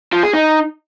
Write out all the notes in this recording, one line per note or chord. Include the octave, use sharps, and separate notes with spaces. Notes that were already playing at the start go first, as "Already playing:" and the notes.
F3
G#4
D#4